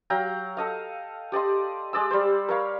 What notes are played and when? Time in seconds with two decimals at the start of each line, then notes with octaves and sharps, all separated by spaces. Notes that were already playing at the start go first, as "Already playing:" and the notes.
0.10 F#3 F5 G5 A#5
0.57 A4 D#5 F5
1.32 G4 D5 D#5 C6
1.93 G#3 D5 E6
2.11 G3 C5
2.49 A#4 C#5 F5 B5